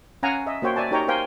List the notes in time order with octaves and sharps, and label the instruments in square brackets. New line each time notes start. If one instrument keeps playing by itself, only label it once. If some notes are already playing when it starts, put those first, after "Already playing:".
[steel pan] C#4 F5 F#5 G#5 A#5
D#5 E5
A#3 F#4 C5 C#5 G5
D5 E5 G#5 A5
D#4 G4 A#4 C#5 G5 A#5
A#4 C5 F5 G5 G#5